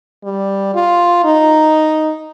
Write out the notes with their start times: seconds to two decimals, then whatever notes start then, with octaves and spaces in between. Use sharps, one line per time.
0.24 G3
0.74 F4
1.24 D#4